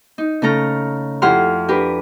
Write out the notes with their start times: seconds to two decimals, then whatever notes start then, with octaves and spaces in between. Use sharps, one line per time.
0.18 D#4
0.42 C#3 A3 A4 A#5 F6
1.22 F2 E4 G4 F#5 C6 F6
1.68 D4 G4 A#4 B4